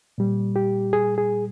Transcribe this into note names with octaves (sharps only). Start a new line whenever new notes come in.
A#2 G3
G4
G#4
G#4